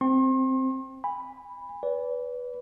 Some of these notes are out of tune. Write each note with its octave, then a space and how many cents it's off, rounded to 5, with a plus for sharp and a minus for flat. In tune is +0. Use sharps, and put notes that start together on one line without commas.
C4 +0 C6 +40
G#5 -35 B5 +0
B4 +0 D5 -40